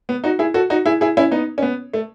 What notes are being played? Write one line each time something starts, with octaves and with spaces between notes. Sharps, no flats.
B3
D#4 F#4
E4 G#4
F#4 A4
D#4 F#4
E4 G#4
E4 G#4
C#4 E4
B3 D#4
C#4
B3
A3